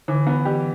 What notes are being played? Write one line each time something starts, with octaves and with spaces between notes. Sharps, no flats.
D3 E3
B3
E3 G4